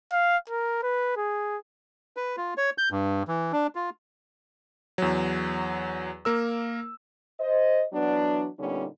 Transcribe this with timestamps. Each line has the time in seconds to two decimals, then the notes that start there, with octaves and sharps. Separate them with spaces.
0.12 F5
0.50 A#4
0.83 B4
1.17 G#4
2.17 B4
2.37 F4
2.58 C#5
2.78 G6
2.91 G2
3.28 E3
3.52 D4
3.75 F4
4.98 E2 F#3
6.25 A#3 A#4 E6
7.39 C5 D#5
7.93 E3 F#3 B3 D4
8.59 A#2 D3 G3 B3 C#4 D#4